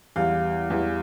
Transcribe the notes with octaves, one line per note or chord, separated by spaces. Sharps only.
E2 E3 G3 F5
E2 E3 G3